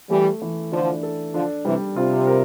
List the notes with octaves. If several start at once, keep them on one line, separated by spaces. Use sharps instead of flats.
E3 G3 A3
E3
D3 F3 D4
A4
D3 F3 D4
C3 E3 G3
C3 F4
A#4